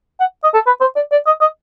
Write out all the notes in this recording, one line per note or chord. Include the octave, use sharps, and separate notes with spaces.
F#5
D#5
A4
B4
C5
D5
D5
D#5
D#5